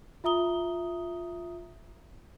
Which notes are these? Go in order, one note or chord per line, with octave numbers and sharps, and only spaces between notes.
F4 E5 A#5 D#6 G7